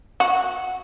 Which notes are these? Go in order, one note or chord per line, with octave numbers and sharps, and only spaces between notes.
F#4